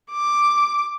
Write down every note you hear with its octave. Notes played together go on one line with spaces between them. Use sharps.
D6